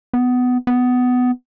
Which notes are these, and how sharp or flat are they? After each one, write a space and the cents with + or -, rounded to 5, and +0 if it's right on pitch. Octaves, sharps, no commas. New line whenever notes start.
B3 +15
B3 +15